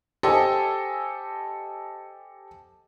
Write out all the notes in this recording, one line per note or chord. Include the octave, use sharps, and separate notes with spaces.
G4 A4 C5 D#5 G#5